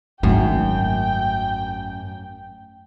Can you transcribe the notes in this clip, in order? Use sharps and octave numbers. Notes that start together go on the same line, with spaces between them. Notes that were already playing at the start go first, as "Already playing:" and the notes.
G#1 F#2 A3 G5